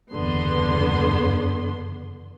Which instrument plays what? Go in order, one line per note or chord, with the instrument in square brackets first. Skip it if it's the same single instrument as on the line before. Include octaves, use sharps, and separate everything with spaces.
[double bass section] F#1 E2 G2 [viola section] D3 B3 C6